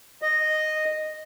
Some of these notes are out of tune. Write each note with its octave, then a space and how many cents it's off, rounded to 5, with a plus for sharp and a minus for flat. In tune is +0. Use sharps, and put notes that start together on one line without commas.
D#5 -10